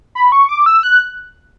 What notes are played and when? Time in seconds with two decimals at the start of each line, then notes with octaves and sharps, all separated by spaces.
0.15 B5
0.32 C#6
0.49 D6
0.66 E6
0.83 F#6